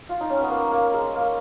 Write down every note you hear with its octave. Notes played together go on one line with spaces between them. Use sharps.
F4
D#4
C#4
B3
A#3
A#3
G#3
A#3